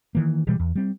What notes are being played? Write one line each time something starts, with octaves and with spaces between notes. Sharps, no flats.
D#3 E3 A#3
B2 E3 G3 G#3
E2
G3 C4